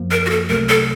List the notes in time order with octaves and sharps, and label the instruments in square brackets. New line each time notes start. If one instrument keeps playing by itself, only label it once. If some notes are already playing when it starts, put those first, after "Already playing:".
Already playing: [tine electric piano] F#2 F3 A#3
[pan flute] A#4
F#4
A4
[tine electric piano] C2 C3 F#3 A3 [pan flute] A#4
[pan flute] A4